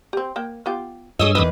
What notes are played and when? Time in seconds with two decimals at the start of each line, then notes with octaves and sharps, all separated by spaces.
0.13 C4 G4
0.36 A#3 G5
0.66 B3 F4 G4
1.19 G2 G#4 C#5 D#5 D#6 E6
1.35 E2 D#3 E4 B4 D5